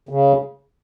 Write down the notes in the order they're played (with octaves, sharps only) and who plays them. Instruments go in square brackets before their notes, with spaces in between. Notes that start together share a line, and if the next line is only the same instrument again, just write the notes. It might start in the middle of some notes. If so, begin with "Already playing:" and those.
[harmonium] C#3